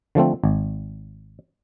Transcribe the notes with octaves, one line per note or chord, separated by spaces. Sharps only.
D3 F3 A3 C4
G#1